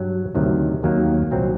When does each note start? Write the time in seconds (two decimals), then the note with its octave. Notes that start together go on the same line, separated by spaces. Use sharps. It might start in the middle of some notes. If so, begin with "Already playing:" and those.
Already playing: G2 F#3
0.35 D2 C3 D#3 F#3
0.83 D#2 D#3 F#3 A#3
1.31 C2 A#2 F#3 C4 F#4